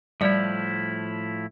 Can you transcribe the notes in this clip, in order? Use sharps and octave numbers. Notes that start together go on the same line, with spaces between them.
A2 F3 G3 E4 D5